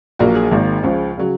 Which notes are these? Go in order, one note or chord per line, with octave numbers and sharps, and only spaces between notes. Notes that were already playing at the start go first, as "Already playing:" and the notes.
A#1 A#2 F#3 A#3 F#4
G#4
G#1 G#2 D#3 A#3
C#2 C#3 F3
C#3 F#3